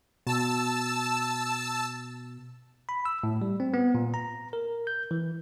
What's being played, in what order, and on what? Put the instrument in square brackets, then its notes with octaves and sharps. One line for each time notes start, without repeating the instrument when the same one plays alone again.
[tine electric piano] B2 [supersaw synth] A5 E6
[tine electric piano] B5
E6
A2
G3
C4
B3
A#2
A#5
A#4
G6
E3